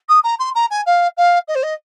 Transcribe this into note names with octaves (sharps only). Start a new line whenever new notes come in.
D#6
A#5
C6
A#5
G#5
F5
F5
D#5
C5
D#5